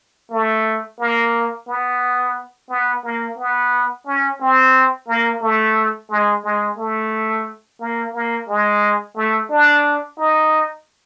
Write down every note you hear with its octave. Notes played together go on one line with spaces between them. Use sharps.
A3
A#3
B3
B3
A#3
B3
C#4
C4
A#3
A3
G#3
G#3
A3
A#3
A#3
G#3
A3
D4
D#4